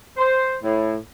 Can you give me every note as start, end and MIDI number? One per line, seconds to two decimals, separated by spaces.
0.17 0.55 72
0.62 0.95 45